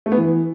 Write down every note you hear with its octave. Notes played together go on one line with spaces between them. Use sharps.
A3
B3
E3